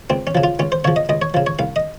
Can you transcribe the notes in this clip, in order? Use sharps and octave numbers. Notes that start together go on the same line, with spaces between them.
C#2 C4
C#4
C#3 F3
F4
C#2 C#4
C5
C#3 F3 C#5
D#5
C#2 D#5
C#5
C#3 F3
C#5
C2 F5
D#5